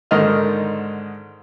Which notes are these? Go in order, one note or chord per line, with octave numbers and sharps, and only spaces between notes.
G#2 D3 D#3 D#5 F6